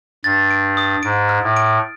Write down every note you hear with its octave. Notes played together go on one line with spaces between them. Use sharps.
G2 A6
D7
D#6
G#2 D7
F6
A2
D7